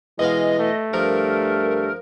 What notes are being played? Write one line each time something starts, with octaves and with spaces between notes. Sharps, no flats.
B2 E3 G#3 B3 D#5 F5
A3
G2 F3 A#4